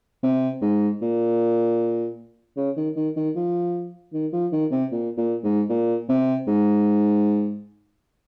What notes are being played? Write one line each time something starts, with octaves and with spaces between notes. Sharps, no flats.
C3
G#2
A#2
C#3
D#3
D#3
D#3
F3
D#3
F3
D#3
C3
A#2
A#2
G#2
A#2
C3
G#2